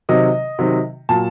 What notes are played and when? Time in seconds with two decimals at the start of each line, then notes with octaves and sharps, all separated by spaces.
0.09 C3 D#3 F#3 D#5
0.59 C3 D#3 F#3
1.09 A#2 F#3 A5